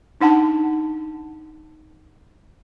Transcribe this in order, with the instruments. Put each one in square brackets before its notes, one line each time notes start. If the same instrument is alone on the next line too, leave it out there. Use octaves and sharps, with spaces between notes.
[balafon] D4 D#4 F#5 A5